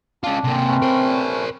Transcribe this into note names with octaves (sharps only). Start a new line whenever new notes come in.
C#4 D4 F4
C3 A#3 C4
A3 C#4 B4
A#4 C5